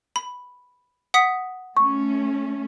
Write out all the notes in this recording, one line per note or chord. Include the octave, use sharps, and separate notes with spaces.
B5
F#5 D#6 B6
A3 C#4 C#6